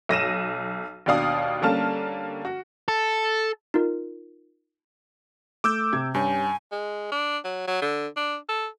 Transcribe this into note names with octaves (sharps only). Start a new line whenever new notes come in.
B1 A#6 D#7 E7
D#2 B2 D4 F5 D#6
D3 G3 A#3 C#4 A5 F6
F#4
A4
D#4 F4 A#4
A3 D6 E6 G6
C3 G#6
G2 C#4 G4 G#5
G#3
D4
F#3
F#3
D3
D4
A4